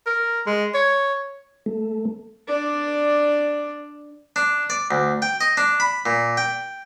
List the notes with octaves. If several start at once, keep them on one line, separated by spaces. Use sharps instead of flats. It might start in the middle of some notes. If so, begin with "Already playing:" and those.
A#4
G#3
C#5
A3
D4 D5
D4
D5
D2
G5
D#5
D4
B5
A#2
G5